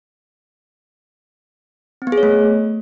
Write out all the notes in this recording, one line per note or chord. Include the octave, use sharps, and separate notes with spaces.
C4
B3
G#4
C#5
A3